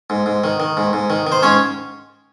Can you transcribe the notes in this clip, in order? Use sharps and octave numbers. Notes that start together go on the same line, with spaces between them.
G#2
G#2
D#3
D#3
G#2
G#2
D#3
D#3
C5
G#2 C#4 C#5